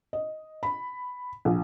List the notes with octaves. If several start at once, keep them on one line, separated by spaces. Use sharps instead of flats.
D#5
B5
A#1